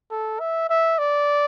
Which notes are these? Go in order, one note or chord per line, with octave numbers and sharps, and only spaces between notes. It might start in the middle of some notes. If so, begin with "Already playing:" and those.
A4
E5
E5
D5